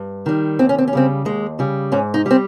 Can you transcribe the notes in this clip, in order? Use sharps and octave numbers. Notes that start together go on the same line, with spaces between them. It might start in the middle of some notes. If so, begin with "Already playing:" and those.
Already playing: G2
D#3 G3
D#2 C4
C#4
C4
C#4
C#3 G3 C4
D#2 G#3
C#3 G3
G#2 C#4
D#4
G3 C4